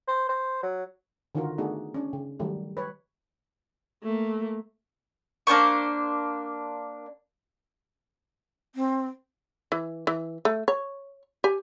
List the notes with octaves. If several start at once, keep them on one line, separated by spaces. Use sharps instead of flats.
C5
C5
F#3
D3 D#3 D#4 F4 F#4 A#4
A3 B3 D4 D#4 F#4 G#4
C#4 D4
C#3
D#3 F#3 G3 A3
B4 C#5
A3 A#3
A#3 D4 C5 C#6
C4
E3
E3
A3
C#5
G4 G#5